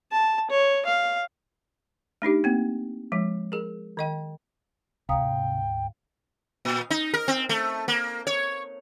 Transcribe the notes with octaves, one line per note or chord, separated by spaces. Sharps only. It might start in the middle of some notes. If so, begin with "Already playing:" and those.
A5
C#5
F5
A3 D4 D#4 G4
A#3 C4
F3 G#3
G#4 A#4
D#3 D#5 G5
D2 G#2 C3 F5 G5 A#5 D#6
A#2
D#4
A#4
C4
A3
A#3
C#5